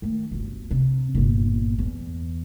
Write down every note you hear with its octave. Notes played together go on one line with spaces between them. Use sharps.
D#3 A3
D1 G1
C3
G1 A#2
E2